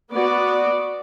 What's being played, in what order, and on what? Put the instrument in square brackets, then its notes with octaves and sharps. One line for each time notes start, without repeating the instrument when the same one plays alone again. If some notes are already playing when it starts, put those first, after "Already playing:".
[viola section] B3 F#4 D5